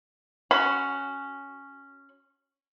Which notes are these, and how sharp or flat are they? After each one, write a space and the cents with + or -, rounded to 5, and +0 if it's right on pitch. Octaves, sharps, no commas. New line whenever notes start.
C#4 +0 F#4 +10 B5 +15